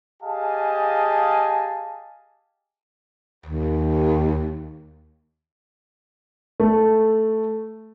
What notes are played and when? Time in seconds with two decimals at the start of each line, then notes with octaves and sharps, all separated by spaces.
0.22 G4 G#4 D#5 F5 G#5 A5
3.46 D#2
6.60 A3